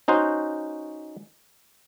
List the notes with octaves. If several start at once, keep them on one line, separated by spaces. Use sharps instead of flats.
C#4 D#4 F#4 C5